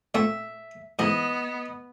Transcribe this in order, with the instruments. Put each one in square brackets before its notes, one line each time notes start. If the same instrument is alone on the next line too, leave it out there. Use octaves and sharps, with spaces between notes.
[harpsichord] A#2 A3 C4 [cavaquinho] E5
[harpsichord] G#2 E3 [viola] B3 [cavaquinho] D#5